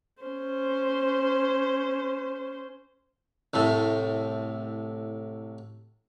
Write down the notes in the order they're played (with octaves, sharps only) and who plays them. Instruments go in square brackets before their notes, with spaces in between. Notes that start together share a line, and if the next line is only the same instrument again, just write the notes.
[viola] C#4 C5
[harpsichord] C2 A2